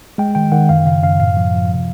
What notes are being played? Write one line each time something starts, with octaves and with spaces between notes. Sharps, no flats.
G#3 G5
D#3 G5
D#3 F#5
F#2 F5
C#3 F5
F#2 F5
A2 F5
F3
F3
C3